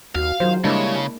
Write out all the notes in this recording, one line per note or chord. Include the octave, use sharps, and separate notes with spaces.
D#2 F#4 F5
D#3 F#3 F4 G#4 C5
C#3 G3 G#3 A#3 D4 E4